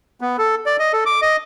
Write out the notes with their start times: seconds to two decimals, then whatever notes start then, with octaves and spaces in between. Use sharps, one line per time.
0.21 B3
0.38 A4
0.66 D5
0.79 D#5
0.93 A4
1.06 D6
1.22 D#5